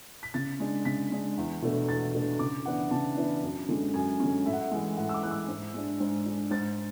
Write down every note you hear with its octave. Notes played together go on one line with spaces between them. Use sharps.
B6
C#3 A6
G#3 D4
C#3 B6
G#3 D4
E2
B2 A3 D4
E2 A6
B2 A3 D4
C#3 D6
E3 B3 D4 F#5
C#3 A5
E3 B3 D4
F#2
D3 G#3 C#4
F#2 G#5
D3 G#3 C#4
A2 E5
F#5
E5
E3 G#3
A2 F#5
E6
D6
E3 G#3 F#6
E6
G#2
G#3 D4
G#2
G#3 D4
G#2 A6